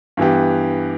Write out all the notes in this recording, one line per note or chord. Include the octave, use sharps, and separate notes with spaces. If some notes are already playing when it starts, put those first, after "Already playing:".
G2 E3 B3 G4